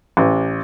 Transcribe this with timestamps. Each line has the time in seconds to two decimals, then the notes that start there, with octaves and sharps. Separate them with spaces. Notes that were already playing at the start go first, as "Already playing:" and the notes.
0.17 A1